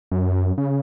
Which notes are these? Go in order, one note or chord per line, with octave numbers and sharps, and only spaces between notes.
F#2
C#3